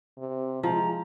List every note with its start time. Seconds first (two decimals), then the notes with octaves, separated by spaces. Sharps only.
0.18 C3
0.63 F3 G#3 A#5